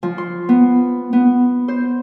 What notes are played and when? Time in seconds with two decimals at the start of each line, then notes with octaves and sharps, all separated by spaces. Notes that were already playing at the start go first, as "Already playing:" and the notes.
0.03 F3
0.18 C6
0.49 B3
1.13 B3
1.68 C5